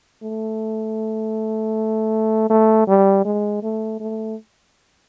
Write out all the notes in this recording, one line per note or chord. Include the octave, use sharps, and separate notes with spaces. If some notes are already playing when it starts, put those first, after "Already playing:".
A3
A3
G3
G#3
A3
A3